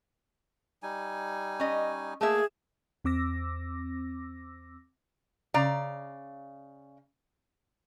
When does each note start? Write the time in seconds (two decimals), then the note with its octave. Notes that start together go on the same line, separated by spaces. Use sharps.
0.83 G3 D#4 G#5
1.60 C#4 D#5
2.21 A3 A#3 G#4 E5
3.05 E2 C4 D6 E6 A#6
5.54 C#3 D5 A#5